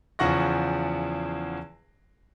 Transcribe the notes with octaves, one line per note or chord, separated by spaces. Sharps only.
E2 C#3 F3 F#5 C#6 A#6